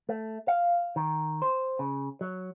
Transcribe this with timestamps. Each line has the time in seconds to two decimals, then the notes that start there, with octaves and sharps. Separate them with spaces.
0.09 A3
0.48 F5
0.96 D#3
1.42 C5
1.79 C#3
2.21 F#3